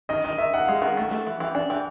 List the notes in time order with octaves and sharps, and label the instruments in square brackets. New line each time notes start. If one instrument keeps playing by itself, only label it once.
[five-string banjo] D#3 [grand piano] D#5
[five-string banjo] D#3 [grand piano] D#5
[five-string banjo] D#3 [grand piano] E5
[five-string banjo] D#3 [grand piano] F#5
[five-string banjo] G#3 [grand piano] F5
[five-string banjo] D#3 [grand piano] F#5
[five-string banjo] A3
A3
E3
[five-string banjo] E3 [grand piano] G5
[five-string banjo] D4 [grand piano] G#5
[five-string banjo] E3 [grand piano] G5